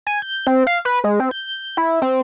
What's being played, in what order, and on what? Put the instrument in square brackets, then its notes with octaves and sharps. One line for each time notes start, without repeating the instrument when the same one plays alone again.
[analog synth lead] G#5
G6
C4
F5
B4
G#3
C4
G6
E4
C4